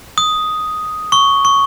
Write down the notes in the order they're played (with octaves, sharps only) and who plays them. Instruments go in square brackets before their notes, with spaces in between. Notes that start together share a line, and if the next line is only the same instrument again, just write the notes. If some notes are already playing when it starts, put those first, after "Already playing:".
[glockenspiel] D#6
C#6
C#6